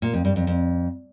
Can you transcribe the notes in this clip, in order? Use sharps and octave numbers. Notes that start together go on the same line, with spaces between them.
A#2
F2
G2
F2
F2